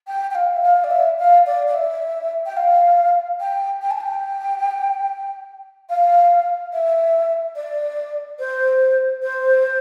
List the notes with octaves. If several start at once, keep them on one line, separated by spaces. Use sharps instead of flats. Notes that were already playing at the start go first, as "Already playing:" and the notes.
G5
G5
F5
E5
F5
D5
E5
F5
D5
D5
E5
G5
F5
G5
G5
A5
G5
F5
E5
D5
C5
C5